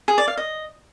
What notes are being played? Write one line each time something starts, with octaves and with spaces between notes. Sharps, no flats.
G#4
D5
F5
D#5